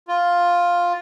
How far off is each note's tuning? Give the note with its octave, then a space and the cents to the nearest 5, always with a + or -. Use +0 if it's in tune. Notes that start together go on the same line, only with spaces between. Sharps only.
F4 +5